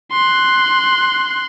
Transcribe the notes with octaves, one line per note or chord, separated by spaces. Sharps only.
C6 F#6